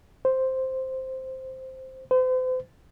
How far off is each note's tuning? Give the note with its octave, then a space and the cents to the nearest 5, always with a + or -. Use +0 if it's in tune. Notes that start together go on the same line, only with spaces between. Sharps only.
C5 +0
C5 -40